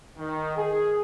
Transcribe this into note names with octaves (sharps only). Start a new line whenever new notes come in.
D#3
G#4